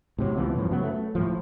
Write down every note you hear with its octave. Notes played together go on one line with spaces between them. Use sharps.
A2 C3 F#3
C#2 B2 E3 F3
F#2 A2 D3 F3
C#3 F#3 B3
A3
A2 F3